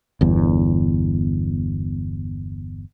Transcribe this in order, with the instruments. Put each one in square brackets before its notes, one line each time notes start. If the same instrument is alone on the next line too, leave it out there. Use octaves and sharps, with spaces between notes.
[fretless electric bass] G1 E2